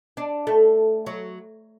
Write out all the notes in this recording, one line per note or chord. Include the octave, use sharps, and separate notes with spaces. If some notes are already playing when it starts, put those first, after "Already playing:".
D4
A3
F#3